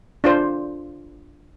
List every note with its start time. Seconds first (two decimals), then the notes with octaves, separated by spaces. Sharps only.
0.24 D4 F4 C5